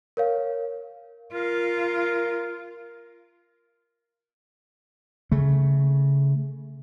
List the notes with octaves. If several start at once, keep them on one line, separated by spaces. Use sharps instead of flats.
A#4 C#5 F5
F4 A#4
C#3 A3